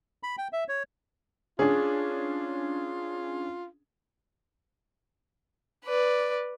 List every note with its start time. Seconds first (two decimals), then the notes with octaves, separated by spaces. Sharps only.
0.23 B5
0.38 G5
0.53 E5
0.68 C#5
1.59 C#4 D4 F4 G#4
5.85 B4 D5